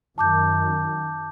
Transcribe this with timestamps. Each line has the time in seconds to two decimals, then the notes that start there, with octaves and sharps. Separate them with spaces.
0.18 F#2 D#3 A5 D6 G6